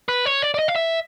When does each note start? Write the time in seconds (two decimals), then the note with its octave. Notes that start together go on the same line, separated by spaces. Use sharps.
0.08 B4
0.25 C#5
0.42 D5
0.54 D5
0.59 D#5
0.68 F5
0.76 E5